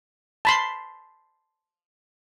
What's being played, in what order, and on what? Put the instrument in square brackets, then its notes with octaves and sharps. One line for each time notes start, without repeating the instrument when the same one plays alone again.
[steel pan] A5 B5 C6